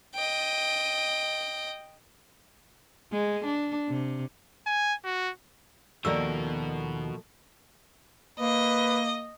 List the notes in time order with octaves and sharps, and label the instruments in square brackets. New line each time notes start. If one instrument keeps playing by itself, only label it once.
[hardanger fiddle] D#5 G5
[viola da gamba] G#3
D4
C3
[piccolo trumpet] G#5
F#4
[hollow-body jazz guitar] D#2 [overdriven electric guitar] B2 F#4 [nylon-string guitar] F3 A3 A#4 [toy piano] D5 E6
[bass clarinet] A#3 [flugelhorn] B4 [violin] D#5